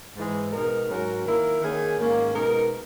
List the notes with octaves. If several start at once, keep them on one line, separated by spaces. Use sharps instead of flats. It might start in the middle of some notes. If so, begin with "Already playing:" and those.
G#2 E3 G#3
B2 G#3 D#4 A#4
G#2 F#3 C#4 F#4 A#4
D#3 A#3 E4 A#4
D#3 A#3 C#4 G#4
G#2 D#3 A#3 C#4
B2 G#3 D#4 A#4